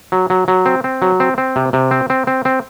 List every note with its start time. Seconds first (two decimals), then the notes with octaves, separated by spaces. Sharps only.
0.12 F#3
0.30 F#3
0.48 F#3
0.66 C4
0.84 C4
1.02 F#3
1.20 C4
1.38 C4
1.56 C3
1.73 C3
1.91 C4
2.10 C4
2.27 C4
2.45 C4